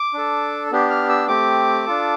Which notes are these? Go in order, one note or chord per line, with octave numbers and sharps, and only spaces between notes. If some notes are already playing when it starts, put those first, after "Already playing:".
Already playing: D6
D4 A4
B3 D4 G4
F6
E6
A3 C4 G4 D6
D4 F4 A4